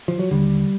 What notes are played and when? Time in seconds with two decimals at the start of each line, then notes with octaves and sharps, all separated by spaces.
0.08 F3
0.19 F#3
0.31 D#2 D3 G3